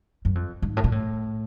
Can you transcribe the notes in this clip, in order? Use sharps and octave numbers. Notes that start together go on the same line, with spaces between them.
F#2
F2
G#2
A2
A#2
A2